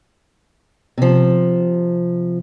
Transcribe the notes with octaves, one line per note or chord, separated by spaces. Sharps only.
C3 F3